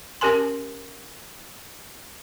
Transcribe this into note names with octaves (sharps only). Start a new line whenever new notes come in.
C#4 G4 A#4 G#5 C6